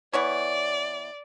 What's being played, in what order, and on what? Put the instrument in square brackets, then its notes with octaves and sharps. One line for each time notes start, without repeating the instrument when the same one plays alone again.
[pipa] E3 B3 C#5 [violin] D5